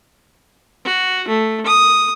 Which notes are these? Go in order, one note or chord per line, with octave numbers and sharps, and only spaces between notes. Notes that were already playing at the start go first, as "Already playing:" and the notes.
F#4
A3
D#6